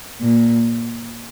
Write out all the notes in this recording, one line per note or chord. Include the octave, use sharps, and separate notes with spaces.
A#2